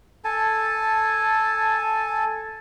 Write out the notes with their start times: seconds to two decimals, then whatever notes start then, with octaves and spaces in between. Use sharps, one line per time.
0.24 A4 G#5 A5